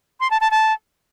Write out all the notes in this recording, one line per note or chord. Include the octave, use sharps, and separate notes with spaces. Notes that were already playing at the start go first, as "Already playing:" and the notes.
C6
A5
A5
A5